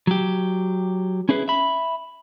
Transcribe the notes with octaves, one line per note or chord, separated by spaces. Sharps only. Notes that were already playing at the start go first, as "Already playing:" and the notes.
F#3 G4
C#4 E4 G#4 B4
E5 B5